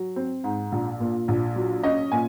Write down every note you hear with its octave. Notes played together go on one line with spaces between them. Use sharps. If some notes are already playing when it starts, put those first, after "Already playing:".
Already playing: F#3
C4
G#2
A#1
A#2
A#1
F#3
C#4 D#5
A#2 G#5